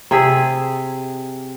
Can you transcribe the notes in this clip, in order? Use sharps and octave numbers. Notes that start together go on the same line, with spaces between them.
C3 G#4 E5